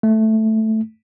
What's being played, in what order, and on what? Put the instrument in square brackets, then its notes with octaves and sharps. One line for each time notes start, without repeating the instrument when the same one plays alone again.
[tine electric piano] A3